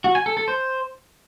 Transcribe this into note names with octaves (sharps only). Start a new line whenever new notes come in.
F#4
G#5
A4
A4
C5